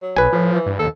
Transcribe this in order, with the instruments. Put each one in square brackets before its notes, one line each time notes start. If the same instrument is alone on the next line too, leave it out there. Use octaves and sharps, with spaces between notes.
[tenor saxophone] F#3
[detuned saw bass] B1 [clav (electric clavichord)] B4 G#5
[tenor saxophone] A2 [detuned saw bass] F3
[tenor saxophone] E3
[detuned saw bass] G2
[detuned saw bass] D#2 [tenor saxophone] A4